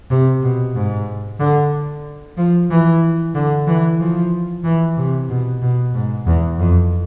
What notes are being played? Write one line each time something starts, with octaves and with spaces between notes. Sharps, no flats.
C3
B2
G#2
D3
F3
E3
D3
E3
F3
E3
C3
B2
B2
G#2
E2
F2